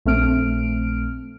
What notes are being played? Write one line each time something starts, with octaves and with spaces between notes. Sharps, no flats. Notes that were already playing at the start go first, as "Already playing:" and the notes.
A#1 A3 C4 F6 D7